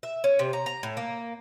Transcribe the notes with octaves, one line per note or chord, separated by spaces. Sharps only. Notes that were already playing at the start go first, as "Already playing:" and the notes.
E5
C#4
C3
A#5
A#5
A2
A#3